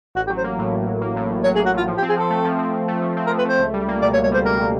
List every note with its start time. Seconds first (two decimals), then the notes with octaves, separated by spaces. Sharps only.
0.15 A1 F#4
0.27 G4
0.30 F#3
0.37 C5
0.44 A#3
0.59 A2
0.73 A1
0.87 F#3
1.01 A#3
1.16 A2
1.31 A1
1.44 F#3 C#5
1.56 G#4
1.59 A#3
1.66 F#4
1.74 A2 F4
1.88 F3
1.98 G4
2.02 C4
2.09 G#4
2.16 F3 A4
2.30 A3
2.45 F3
2.59 C4
2.73 F3
2.88 A3
3.02 F3
3.17 C4
3.27 A#4
3.31 F3
3.38 B4
3.45 A3 C5
3.59 C#2
3.74 G3
3.88 A#3
4.02 B2 D5
4.14 C#5
4.17 C#2
4.24 C#5
4.32 G3 C5
4.45 A#3 A#4
4.60 B2